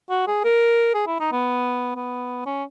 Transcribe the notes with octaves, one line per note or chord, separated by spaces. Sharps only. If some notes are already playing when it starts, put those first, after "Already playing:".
F#4
G#4
A#4
G#4
E4
D#4
B3
B3
C#4